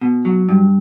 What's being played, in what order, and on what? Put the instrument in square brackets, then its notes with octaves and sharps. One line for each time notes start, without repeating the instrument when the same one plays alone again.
[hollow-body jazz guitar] B2
F#3
G2